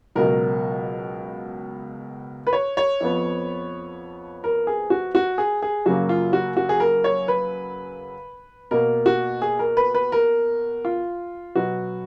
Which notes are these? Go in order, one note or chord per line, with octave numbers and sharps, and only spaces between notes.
C#2 B2 F#3 A#4
B4
C#5
C#5
F2 F3 B3
A#4
G#4
F#4
F#4
G#4
G#4
F#2 C#3 F#3 A#3 F#4
F4
F#4
F#4
G#4
A#4
C#5
B4
B2 A#3 A#4
F#4
G#4
A#4
B4
B4
A#4
F4
B2 F#3 B3 F#4